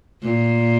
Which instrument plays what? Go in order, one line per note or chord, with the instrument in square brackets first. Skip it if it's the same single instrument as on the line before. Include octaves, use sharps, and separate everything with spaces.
[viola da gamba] A#2